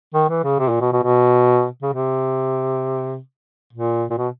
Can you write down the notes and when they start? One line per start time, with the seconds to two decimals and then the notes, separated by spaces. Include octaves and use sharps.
0.14 D#3
0.29 E3
0.44 C#3
0.59 C3
0.70 A#2
0.81 B2
0.93 B2
1.03 B2
1.82 C#3
1.93 C3
3.73 A#2
4.10 A#2
4.18 B2